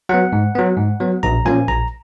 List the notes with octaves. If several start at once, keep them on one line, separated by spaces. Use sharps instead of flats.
F#3 B3 F#5
G#2
F#3 B3
G#2
F#3 B3
A#1 A#5
A#2 F3 A#3 C#4 G#5
A#1 A#5